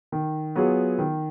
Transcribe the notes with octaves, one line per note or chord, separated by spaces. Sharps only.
D#3
F#3 B3 F4 G#4
D#3